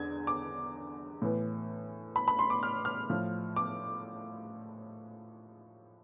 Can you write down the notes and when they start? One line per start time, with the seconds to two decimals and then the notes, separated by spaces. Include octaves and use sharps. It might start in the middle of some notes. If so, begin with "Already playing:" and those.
Already playing: E2 D3 G#6
0.27 D6
1.22 A2 E3
2.16 B5
2.28 B5
2.39 C6
2.50 D6
2.63 F6
2.85 F6
3.10 A2 F3
3.56 D6